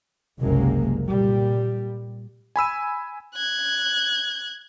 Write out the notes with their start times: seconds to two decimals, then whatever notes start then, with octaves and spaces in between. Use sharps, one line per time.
0.40 F#1 C2 F#2 C3 G#3 A#3
1.07 A#2 G3
2.56 G#5 B5 E6 D#7
3.35 F#6 G#6